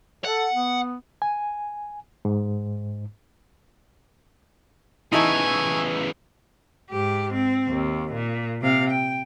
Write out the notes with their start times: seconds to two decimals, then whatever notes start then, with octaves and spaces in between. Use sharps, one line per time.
0.25 A4 F#5
0.53 B3
1.22 G#5
2.25 G#2
5.12 C#3 E3 D#4 E4 G#5 A5 C#6
6.90 G#2 G4
7.34 C4
7.69 D#2
8.13 A#2
8.61 C3 F5
8.90 G5